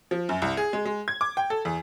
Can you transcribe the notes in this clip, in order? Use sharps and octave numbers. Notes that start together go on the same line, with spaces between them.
F3
F#2
C2
G#4
G#3
G#3
G#6
D6
G5
A4
E2